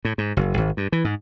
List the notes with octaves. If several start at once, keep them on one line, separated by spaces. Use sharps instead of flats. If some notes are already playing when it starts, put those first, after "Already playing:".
A2
G#2
F#1
G#1
G2
E3
G#2